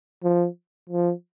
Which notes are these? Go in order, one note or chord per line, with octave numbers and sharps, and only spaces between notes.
F3
F3